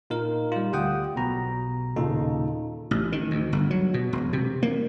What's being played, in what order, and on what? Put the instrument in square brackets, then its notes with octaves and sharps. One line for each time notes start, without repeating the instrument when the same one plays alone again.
[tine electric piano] A#2 D#4 F4 A#4
G3 F4
D2 G4 F#5 G5 D#6
B1 B2 A#5
D#2 A#2 C#3 D#4 F4 A4
[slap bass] A1
D#3
D2
G1
F#3
B2
E1
C3
A#3